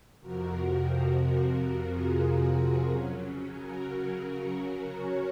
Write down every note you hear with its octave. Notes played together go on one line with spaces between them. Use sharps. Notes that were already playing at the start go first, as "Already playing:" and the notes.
F2 C3 F3 F#4 A#4
F#4
F4 G#4
F#4
F4 G#4
C#3 F#3 C#4
F#4 A#4
A#4 C#5